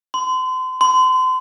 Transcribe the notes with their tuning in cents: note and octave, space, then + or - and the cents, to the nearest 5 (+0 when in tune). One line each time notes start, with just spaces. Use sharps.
C6 -35
C6 -35